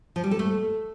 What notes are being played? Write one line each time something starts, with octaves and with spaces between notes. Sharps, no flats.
F3
G3
A4
A3